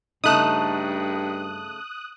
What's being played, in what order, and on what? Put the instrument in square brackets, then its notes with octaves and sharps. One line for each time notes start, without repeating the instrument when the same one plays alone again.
[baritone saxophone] G2 [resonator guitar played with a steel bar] C#3 A3 D#4 [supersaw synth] D#6 F#6